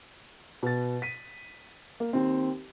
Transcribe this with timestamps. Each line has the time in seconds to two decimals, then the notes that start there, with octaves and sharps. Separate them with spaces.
0.63 B2 A6
1.02 B6 D#7
2.00 A#3
2.13 D#2 C4